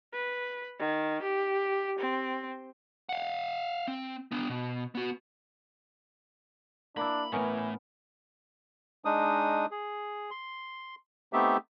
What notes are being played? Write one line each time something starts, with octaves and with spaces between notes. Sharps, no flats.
B4
D#3
G4
C4
F5 F#5
C4
B3 D4
B2
B3 F#4
A#3 D4 E4 B5
A2 E3 A3 B3 C#4 A#4
G#3 D4 D#4 D#6
G#4
C6
A3 B3 C4 D#4 G4 E5